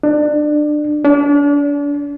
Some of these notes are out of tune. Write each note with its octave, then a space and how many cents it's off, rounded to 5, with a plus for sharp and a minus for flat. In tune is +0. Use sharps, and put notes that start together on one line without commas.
D4 +25
D4 -35